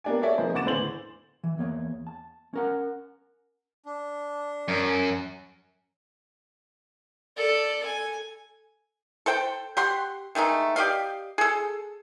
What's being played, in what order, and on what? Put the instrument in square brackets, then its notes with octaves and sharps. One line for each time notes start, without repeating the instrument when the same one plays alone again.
[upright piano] A#3 B3 D4 G4 G#5
F#4 G#4 A4 C#5 D5 E5
E3 F3 A#3 C4 D#4 C5
D#2 C#3 F#5 D6 A6 E7
A2 D3 E3 C5 C6 F#7
[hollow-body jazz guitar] E3
E2 A#3 C#5
A5
C#4 A#4 F#5
[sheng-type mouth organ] D4
[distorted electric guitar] F#2
[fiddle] A4 D5
G#5
[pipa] A4 C5 G5
G4 F#5 C6
D#3 G#3 A3 D#4
G4 D5 D#5 F5
G#4 A4